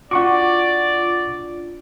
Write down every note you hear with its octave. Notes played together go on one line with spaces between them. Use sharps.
D4 F4 F#4 D5 F#5 C#6 D6